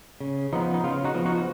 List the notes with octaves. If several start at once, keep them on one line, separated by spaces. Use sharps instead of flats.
C#3
F3 B3 D#4
D#4
C#3 F4
D#4 F#4
F3 B3
D#4 F#4